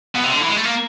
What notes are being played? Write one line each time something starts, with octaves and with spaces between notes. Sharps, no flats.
B2
C3
D3
E3
G#3
A3
A#3